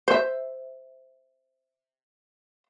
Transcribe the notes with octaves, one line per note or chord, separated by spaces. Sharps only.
C5 E5